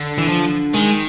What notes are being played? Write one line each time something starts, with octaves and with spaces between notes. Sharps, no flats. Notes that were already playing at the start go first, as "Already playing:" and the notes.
Already playing: D3
E3
F3
D#3 G#3